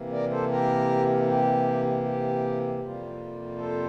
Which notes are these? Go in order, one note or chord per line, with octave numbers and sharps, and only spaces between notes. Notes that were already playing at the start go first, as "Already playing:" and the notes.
Already playing: C3 E3 A#3
A#4 D5
A4 C5
G4 A#4
G4
G4
F2 C3 G3 A#3 F4
A4 C5